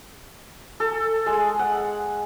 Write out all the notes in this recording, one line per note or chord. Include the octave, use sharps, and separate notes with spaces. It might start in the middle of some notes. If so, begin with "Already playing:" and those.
A4
G#3
F#5